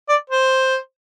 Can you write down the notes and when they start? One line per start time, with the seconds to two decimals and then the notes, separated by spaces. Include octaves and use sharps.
0.09 D5
0.30 C5